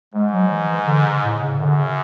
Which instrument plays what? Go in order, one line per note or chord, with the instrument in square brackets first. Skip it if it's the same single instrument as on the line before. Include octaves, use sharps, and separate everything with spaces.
[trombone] G#2 [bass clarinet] G#3
[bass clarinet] F#3
E3
E3
D3
C#3
A2
C#3
[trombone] F#2 [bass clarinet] D3
[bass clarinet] C#3